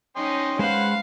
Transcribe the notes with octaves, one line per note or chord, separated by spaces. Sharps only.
C#4 D#4 D#5 G5 C6
G#3 B4 C5 F5 F#5